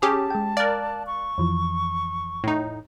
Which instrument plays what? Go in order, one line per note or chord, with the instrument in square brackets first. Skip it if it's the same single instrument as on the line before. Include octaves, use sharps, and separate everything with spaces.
[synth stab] C#4 G4 G#4 [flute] A5
[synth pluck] G#3 G5
[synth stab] A#4 D5 [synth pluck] F5 F#6
[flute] C#6
[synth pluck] F2 E3 F3
[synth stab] A2 D#4